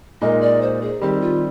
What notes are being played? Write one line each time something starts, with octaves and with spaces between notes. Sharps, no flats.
A#2 G#3 D#4 A#4 D#5
D5
C5
G#4
D#3 G3 C4 G4
F4